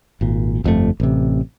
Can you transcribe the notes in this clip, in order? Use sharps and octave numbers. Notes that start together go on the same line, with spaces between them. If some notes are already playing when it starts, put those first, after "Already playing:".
G#1 A#2
G1 F2 C3 A3
A1 C3